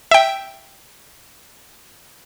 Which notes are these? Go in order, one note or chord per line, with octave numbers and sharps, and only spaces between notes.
E5 G5